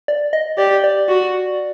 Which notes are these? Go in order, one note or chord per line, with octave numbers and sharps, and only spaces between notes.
D5
D#5
G4 D5
D5
F#4